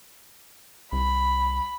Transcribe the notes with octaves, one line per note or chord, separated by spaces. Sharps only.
C2 B5